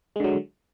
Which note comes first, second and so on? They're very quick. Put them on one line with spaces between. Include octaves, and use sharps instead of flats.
G#3 D3 F#3